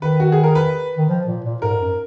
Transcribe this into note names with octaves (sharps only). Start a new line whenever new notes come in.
D#3 B4
F#4
G#4
A#4
B4
D#3
F3
A#2
A#2
G#2 A#4
F#2